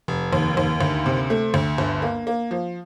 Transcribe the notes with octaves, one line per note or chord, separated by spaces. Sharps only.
F1
D#2
D#2
D2
C3
A3
D2
G1
A#3
A#3
F3